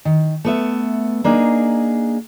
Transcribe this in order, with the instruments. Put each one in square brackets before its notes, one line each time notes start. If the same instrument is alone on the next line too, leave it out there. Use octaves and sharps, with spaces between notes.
[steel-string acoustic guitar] D#3
A3 B3 E5
A#3 D4 D#4 G#4